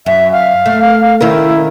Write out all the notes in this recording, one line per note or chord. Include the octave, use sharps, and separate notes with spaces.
F#2 E5
F5
A3
D#3 C#4 E4 A#4